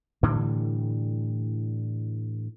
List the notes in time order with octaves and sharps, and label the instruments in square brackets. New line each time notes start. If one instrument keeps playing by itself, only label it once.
[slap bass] A2 D3 E3 G3